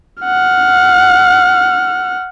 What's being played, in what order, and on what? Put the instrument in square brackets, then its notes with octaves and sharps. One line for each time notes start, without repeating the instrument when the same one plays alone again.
[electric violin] F#5 F6